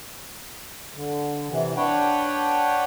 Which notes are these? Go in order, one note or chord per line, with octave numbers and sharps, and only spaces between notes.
D3
C3 E3
D4 B4 C#5 F#5 G5